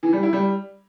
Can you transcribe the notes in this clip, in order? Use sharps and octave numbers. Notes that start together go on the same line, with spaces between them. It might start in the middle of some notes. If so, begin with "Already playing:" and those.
E3
G3
E4
G3